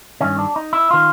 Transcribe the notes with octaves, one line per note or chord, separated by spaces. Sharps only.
G2 D#3 C#4
D4
D#4
E4
D#3 F4